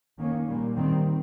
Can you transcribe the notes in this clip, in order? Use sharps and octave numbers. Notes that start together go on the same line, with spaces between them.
D#3 A#3 C#4
A#2 G3 A#3
D#3 G3 C4